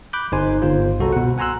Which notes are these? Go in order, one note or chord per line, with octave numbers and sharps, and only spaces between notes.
B5 D6 F#6 G6
G1 D#4 C5 G#5 C6
G1 F4 C5
C2 F#4 A4 A#5
B2 F#5
F#5 G#5 A#5 C6 E6 F#6